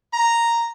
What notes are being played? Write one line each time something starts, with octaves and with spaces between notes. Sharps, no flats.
A#5